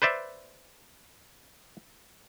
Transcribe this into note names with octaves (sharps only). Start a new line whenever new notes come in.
B4 C5 D5 E5